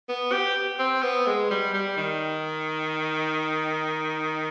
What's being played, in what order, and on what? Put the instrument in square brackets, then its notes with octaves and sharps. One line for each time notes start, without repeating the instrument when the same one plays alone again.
[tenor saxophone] B3
G4
C4
B3
G#3
G3
G3
D#3